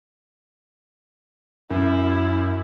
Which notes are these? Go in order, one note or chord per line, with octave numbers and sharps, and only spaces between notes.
F#2 E4